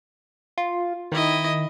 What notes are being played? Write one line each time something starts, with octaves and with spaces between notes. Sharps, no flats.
F4
D#3 E4 D#5